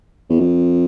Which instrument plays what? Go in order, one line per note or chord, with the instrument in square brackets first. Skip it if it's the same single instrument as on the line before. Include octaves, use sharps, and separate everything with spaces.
[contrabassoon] E2
F2